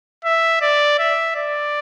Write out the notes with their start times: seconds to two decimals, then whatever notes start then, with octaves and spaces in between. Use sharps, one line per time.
0.25 E5
0.62 D5
0.99 E5
1.36 D5